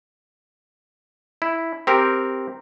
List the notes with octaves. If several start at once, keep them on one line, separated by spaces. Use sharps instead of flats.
E4
C4 G4 A#4